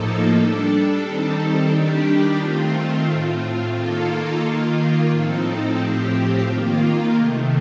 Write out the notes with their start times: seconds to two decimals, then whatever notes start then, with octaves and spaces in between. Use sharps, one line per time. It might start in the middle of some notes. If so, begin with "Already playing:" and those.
Already playing: A2 F3 A#3 D#4 A4
0.36 G3 D4 A4
1.03 D#3 G3 C4 D#4 A4
1.72 D#3 G3 D4 G4
2.40 D#3 A3 C4 F4
3.07 A2 A3 C4 F4
3.76 D#3 A#3 F4 A4
4.43 D#3 A#3 F4
5.10 A2 F3 C4 D#4 A4
5.78 A2 F3 C4 G4
6.47 D#3 A#3 F4
7.14 C3 D#3 A3